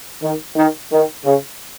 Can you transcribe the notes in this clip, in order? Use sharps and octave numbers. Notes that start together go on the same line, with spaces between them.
D#3
D#3
D#3
C#3